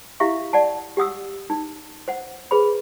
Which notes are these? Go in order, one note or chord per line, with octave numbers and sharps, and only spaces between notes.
E4 G4 E5 F5 C#6
D5 F#5 A5
G4 F#5 D#6 E6
D#4
C5 F#5
G#4 B4 C5 B5